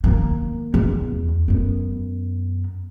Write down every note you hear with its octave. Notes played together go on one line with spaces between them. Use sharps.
D#3 A#3
E2
F#2 B3